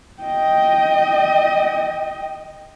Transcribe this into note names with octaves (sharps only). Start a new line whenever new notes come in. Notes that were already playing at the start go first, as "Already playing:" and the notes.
D#5 G5